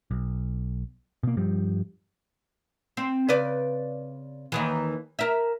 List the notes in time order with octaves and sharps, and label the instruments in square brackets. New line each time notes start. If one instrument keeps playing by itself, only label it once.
[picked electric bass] B1
B2 A#3
G2 F3 G3
[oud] C4
C#3 B4 D5
D#2 D#3 E3
A#4 E5